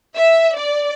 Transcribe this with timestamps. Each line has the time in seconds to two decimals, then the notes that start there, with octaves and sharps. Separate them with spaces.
0.15 E5
0.56 D5